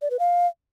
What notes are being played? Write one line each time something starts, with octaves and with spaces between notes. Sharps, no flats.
D5
B4
F5